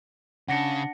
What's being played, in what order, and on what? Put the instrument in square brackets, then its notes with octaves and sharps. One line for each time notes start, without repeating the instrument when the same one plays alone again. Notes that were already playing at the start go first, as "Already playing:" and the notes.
[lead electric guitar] C#3 [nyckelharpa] D4 [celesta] F#5 A#6 C#7